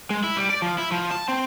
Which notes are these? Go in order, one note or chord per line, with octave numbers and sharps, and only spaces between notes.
G#3
E4
G3
D5
F3
E4
F3
A5
C4